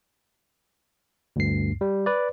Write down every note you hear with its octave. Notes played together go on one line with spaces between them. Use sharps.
D2 G2 C7
G3
B4 D5